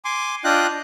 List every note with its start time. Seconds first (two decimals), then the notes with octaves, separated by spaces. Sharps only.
0.05 G#5 C6 D6
0.44 D4 F4 D#5 G5 F#6